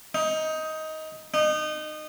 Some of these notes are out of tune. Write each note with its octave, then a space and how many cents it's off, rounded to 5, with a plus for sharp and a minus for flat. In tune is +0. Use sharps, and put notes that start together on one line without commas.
D#4 +15
D#4 -25